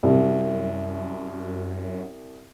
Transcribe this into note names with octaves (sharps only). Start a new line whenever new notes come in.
C2 F#2